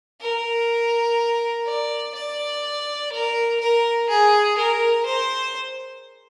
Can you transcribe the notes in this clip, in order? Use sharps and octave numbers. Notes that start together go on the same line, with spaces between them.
A#4
D5
D5
A#4
A#4
G#4
A#4
C5